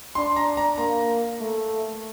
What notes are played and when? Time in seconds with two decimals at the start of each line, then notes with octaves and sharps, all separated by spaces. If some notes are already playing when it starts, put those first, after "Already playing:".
0.15 D4 C6
0.36 A#5
0.57 A#5
0.78 A#3 A#5
1.41 A3